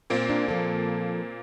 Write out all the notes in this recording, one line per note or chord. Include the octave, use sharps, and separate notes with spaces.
A#2 A#3 C4
D4
F3 A4